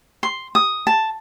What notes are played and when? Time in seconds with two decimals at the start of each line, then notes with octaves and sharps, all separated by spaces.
0.23 C6
0.55 D#6
0.87 A5